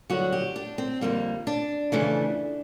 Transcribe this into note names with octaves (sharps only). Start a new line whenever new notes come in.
G2 D3 F#3 F#4
G4
D4
C4
F2 D3 G3 A#3
D4
F2 C#3 E3 A3